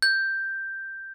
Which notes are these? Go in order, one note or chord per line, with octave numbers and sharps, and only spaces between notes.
G6